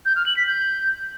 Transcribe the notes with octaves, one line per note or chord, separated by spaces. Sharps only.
G6
F6
F#7
B6
G6